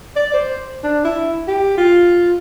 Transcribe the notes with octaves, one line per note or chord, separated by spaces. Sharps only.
D5
C5
D4
E4
G4
F4